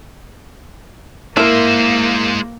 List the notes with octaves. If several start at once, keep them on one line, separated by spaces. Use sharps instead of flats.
G#3 A#3 E4 A#4 C5